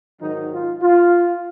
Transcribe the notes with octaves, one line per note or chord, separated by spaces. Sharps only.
G#2 D#3 F#3 D#4
F4
F4